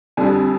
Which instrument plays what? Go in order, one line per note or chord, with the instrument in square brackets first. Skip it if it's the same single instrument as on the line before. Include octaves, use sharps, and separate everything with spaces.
[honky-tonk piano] F2 D3 G3 G#5